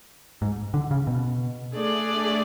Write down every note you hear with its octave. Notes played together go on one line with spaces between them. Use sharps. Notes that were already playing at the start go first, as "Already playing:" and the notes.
G#2
D3
C#3
B2
A3 D4 G#4 D5